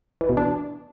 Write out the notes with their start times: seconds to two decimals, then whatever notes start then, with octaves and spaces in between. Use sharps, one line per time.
0.21 E3
0.29 B2
0.37 D4